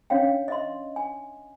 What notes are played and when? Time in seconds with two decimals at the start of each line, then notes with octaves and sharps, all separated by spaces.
0.10 C#4 D4 C#5 F5 G5
0.48 D#5 E5 C6
0.96 G#5